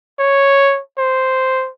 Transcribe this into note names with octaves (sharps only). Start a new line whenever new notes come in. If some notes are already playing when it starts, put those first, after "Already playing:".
C#5
C5